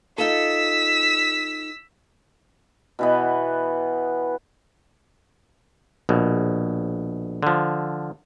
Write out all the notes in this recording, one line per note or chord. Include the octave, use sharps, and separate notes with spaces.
D#4 F4 A4 E6 B6
B2 E3 B3
A#1 B2
D3 F3